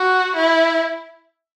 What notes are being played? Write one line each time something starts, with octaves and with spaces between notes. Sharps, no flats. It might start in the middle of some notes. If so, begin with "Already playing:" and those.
Already playing: F#4
E4